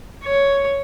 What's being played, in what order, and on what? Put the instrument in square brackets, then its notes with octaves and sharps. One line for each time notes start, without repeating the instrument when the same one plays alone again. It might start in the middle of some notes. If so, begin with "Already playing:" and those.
[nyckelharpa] C#5